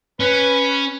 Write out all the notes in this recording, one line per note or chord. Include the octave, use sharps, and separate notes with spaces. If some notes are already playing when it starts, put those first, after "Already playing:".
C#4 B4